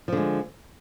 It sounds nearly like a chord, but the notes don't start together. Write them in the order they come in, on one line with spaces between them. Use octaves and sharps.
F3 D3 G#3